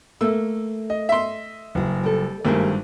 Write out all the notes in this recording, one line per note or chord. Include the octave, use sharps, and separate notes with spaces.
A3 A#3 E6
D#5
E5 C6
F#1 G2 F#4
G3 A4
G#1 G2 A3 A#3 G4 G#4